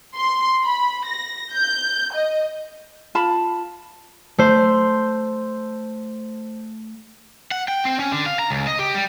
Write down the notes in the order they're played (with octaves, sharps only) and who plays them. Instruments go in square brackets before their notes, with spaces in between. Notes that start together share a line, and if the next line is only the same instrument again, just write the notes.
[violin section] C6
B5
A#6
G6
D#5
[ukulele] F4 A5 B5
[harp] A3 C5
[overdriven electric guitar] F#5
G5
C4
C#4
D3
F5
A#5
C#2
D#5
G4
G3